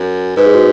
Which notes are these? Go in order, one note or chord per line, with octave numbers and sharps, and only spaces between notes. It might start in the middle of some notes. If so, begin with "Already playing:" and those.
Already playing: F#2
G#2 B4
G#4
F#4